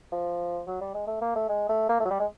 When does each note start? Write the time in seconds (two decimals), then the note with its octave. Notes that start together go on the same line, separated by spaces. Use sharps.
0.12 F3
0.67 F#3
0.81 G3
0.94 G#3
1.07 A3
1.21 A#3
1.35 A3
1.49 G#3
1.69 A3
1.89 A#3
2.00 A3
2.05 F#3
2.10 G3
2.20 G#3